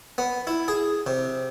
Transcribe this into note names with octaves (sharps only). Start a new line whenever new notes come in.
B3
E4
G#4
C3